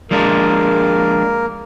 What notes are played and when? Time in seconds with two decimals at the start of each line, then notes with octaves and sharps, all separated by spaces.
0.11 F3 G#3 A#3 D4 A#4